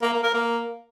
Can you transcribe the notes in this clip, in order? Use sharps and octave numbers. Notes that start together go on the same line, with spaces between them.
A#3
A#3
A#4
A#3